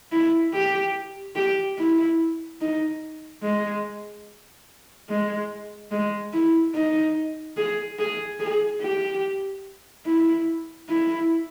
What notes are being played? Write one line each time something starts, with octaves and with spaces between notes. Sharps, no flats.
E4
G4
G4
E4
D#4
G#3
G#3
G#3
E4
D#4
G#4
G#4
G#4
G4
E4
E4